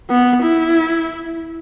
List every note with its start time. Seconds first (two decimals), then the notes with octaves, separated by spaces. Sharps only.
0.10 B3
0.43 E4